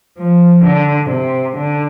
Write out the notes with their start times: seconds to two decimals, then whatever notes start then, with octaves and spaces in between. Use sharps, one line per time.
0.18 F3
0.64 D3
1.10 C3
1.57 D3